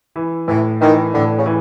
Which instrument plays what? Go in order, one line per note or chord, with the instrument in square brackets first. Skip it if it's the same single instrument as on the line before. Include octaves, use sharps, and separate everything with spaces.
[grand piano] E3
[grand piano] A2 [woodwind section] E3
[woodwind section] D#3 [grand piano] E3
[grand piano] A2 [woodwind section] D3
[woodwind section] C#3
[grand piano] E3